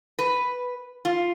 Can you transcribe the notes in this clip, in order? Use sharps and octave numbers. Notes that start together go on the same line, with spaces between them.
B4
F4